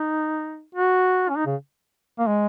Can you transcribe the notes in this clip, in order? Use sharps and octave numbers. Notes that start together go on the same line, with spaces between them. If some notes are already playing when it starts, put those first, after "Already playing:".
Already playing: D#4
F#4
C#4
D#4
C#3
A#3
G#3